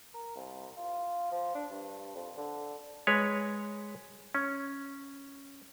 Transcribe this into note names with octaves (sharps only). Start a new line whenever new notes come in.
A#4
C2
F4
F3
D4
G2
F2
D3
G#3 B4 C#5
C#4